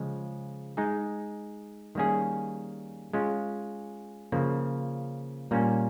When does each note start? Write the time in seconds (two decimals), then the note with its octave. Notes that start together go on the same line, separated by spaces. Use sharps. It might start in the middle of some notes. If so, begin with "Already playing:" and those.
Already playing: C#3 F3 G#3
0.77 G#3 D#4 G#4
1.95 D#3 G3 A#3 C#4 G#4
3.13 G#3 C#4 F4
4.32 C#3 F3 A#3
5.51 A#2 G3 A#3 C#4